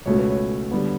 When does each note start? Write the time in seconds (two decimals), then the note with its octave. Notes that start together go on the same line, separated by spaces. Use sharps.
0.06 C#2 B2 A3 C#4 C#5
0.18 B4
0.30 C#5
0.71 D3 G3 B3